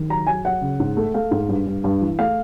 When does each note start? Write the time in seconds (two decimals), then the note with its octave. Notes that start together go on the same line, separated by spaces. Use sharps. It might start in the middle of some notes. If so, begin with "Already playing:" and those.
Already playing: D#3
0.09 F#3 A#5
0.27 F#3 G#5
0.45 F#3 F#5
0.62 C#3
0.80 G#2
0.97 A3
1.14 A3 F5
1.31 G#2
1.49 G2
1.67 G2
1.84 G2
2.01 E3
2.19 A3 F5